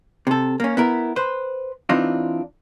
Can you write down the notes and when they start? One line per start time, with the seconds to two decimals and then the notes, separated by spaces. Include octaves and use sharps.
0.27 C3 A4
0.60 A#3 C#4
0.77 B3 E4 A#4
1.16 B4 C5
1.89 E3 C4 D4 D#4 F4